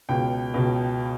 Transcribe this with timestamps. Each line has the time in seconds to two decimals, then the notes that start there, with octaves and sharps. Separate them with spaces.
0.09 C#2 B2 G5
0.54 C#2 B2